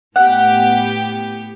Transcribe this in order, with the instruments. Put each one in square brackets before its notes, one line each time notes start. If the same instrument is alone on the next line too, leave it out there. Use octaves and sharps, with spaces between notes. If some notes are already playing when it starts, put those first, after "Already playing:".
[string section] A2 B3 G4 [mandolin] F#5